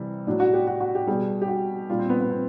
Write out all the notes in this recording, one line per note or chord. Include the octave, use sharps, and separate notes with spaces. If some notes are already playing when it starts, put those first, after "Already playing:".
Already playing: C3 E3 G3
A2 F#3 D4
F#4
G4
F#4
F#4
G4
B2 G3 G#4
G4
F#4
A#2 G3 F4
C4
B3
B3
C4